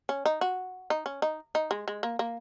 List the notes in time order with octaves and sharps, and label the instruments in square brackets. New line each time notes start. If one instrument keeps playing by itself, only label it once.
[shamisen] C#4
D#4
F#4
D#4
C#4
D#4
D#4
G#3
G#3
A#3
A#3